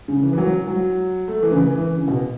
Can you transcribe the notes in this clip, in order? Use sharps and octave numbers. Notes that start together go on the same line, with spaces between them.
C#3
E3
E3
F#3
F#3
A3
E3
C#3
E3
E3
C#3
B2